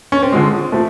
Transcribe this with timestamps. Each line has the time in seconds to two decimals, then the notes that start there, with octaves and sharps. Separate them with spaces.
0.12 C#4
0.22 C4
0.32 D3 F3 G#3
0.72 F3 A3